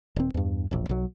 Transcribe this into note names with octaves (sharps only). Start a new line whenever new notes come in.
D#1 C4
E2 G2
E1 A#1
B1 F#3